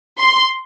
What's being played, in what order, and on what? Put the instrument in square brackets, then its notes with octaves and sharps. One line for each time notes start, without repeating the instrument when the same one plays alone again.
[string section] C6